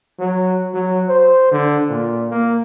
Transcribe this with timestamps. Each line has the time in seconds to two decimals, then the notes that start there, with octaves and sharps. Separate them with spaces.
0.20 F#3
0.74 F#3
1.09 C5
1.51 D3
1.90 A#2
2.31 A#3